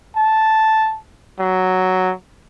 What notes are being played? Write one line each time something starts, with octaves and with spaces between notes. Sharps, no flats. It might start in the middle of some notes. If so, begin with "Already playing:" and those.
A5
F#3